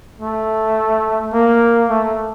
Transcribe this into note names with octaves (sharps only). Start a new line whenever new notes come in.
A3
A#3
A3